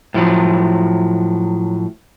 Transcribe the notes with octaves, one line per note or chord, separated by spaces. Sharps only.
A2 F3 F#3